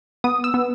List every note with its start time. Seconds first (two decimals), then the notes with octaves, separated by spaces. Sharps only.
0.24 B3 D#6
0.44 E6
0.54 B3